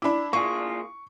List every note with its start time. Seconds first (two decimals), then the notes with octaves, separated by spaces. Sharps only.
0.02 D4 E4 B5 D6
0.33 A#3 F4 G#4 C#6